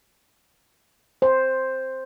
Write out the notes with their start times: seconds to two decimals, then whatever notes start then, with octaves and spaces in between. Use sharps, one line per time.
1.22 C5